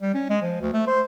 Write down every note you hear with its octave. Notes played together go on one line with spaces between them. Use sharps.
G3
C#4
G#3
F3
D2
A3
C5